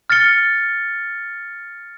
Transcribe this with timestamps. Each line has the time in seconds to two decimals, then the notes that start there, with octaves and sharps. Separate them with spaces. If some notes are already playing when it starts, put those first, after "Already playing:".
0.10 F6 A6 C#7 G7